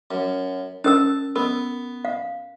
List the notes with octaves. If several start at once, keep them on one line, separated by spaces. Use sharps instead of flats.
F#2
C#4 A#4 A5 E6
B3 A#4
F5